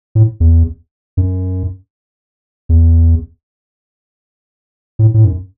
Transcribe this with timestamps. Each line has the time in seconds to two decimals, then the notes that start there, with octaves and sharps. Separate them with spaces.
0.15 A2
0.40 E2
1.17 F#2
2.69 E2
4.99 A2
5.14 A2
5.25 F#2